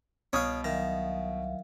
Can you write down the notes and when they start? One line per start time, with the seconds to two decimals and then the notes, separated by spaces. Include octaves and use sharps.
0.33 C2 B2 C#5 F5 C#6 D#6
0.64 D#3 F#3 E5 F5